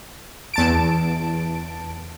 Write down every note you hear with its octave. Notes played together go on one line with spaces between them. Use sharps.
E2 A5 D7